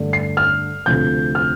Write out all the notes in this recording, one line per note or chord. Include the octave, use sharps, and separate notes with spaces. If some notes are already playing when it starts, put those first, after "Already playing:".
Already playing: G2 D3 A3
C7
F6
D2 C3 F3 A3 G6
F6